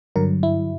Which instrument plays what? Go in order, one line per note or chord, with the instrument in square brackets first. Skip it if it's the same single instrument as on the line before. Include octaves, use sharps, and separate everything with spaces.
[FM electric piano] G2 D3 F#3 A#4
E4